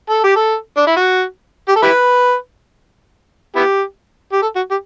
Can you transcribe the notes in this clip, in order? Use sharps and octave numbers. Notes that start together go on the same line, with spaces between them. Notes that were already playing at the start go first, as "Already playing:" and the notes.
A4
G4
A4
D4
E4
F#4
G4
A4
E4 G4 B4
B3 E4 G4
G4
A4
F#4
G4